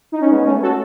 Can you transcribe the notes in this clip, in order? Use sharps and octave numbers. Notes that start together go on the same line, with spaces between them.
D#4
C#4
G#3 B3
A3 C#4
F#4 A4